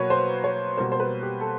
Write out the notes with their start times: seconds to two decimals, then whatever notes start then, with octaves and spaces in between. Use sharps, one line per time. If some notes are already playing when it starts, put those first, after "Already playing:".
Already playing: B2 F#3 A#3 B4 C#5
0.10 C5
0.44 C#5
0.77 B2 G3 A#3 C5
0.92 C5
1.00 B4
1.22 G4
1.41 A4